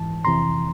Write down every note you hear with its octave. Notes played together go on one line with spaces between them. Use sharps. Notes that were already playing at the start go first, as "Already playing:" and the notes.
Already playing: G#2 E3 A5
F2 C3 E3 A#5 C6